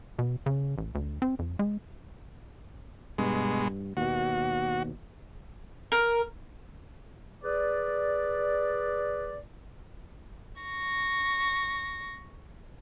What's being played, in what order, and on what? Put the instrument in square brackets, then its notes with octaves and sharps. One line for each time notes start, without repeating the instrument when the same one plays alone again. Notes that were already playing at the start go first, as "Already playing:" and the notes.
[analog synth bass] B2
C#3
A1
D2
C4
F2
G#3
[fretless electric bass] G2 [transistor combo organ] B2 G#3
[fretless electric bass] D#2 B2 [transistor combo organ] F#4
[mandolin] A#4
[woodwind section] G#4 B4 D5
[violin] C#6 A#6